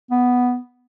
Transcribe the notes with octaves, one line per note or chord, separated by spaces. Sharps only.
B3